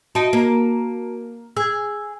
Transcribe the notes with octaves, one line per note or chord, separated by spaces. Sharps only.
D#4 F#4 D#5 A5 D7
A#3
G#4 E6 G#6